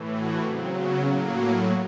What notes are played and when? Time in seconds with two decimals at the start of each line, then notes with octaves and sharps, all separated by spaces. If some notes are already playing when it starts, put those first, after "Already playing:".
Already playing: A2 E3
0.11 F#4
0.44 C#3 F#3 C4
0.76 B3
1.06 A2 F#3 A#3